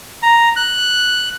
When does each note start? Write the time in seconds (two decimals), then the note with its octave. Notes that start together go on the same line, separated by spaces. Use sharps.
0.23 A#5
0.56 F#6